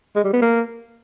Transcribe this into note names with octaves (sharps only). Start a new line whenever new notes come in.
G#3
G3
B3
A#3